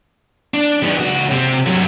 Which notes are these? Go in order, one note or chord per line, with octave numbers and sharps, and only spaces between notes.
D4
D#3 B3
C#2 F#4
C3 C4
G2 F#3